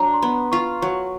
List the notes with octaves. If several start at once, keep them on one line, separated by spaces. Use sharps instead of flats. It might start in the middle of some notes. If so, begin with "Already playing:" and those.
Already playing: F#3 D4 A#5
C6
B3 B5
F4 C#6
F#3 C#6